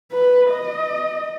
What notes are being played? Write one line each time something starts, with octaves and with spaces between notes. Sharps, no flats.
B4
D#5